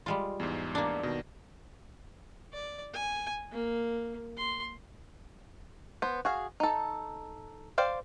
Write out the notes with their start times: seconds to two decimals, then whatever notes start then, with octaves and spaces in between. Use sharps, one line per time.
0.06 G3 G#3 F4
0.40 E2 G#2
0.75 A#3 D4
1.03 B2 D#3
2.53 D5
2.94 G#5
3.52 A#3
4.37 C6
6.02 B3 C5
6.25 F#4 G#4 F5
6.60 D#4 A4
7.78 C5 D5 F5 G5